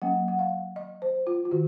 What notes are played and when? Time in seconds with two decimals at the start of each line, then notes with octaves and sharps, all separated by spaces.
0.02 F#3 A#3 C#4 F#5
0.28 F#5
0.39 F5
0.76 D#5
1.02 C5
1.27 F4
1.45 F4
1.51 D#3 F#4